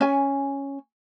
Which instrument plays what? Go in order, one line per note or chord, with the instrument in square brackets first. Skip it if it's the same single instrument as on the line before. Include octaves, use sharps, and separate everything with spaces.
[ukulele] C#4 G#5